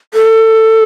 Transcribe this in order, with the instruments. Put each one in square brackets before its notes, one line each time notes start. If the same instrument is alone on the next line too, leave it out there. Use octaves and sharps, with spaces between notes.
[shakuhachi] A4